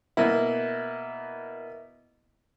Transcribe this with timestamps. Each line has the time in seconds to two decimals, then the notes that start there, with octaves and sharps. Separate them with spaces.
0.17 B2 A#3 E4